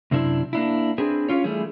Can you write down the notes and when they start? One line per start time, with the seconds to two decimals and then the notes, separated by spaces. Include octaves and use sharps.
0.11 F#2 C3 C4 D4 E4
0.53 A#3 D4 E4
0.98 C4 D4 G#4 B4
1.29 C#4 F4 C#5
1.44 E3 G3 A3 G#4